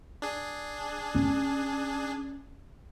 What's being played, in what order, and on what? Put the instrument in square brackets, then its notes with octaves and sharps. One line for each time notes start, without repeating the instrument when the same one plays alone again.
[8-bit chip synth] D4 G#4
[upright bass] C#4